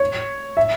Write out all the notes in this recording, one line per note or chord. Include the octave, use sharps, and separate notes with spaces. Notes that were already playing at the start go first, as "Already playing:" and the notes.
Already playing: C#5
E5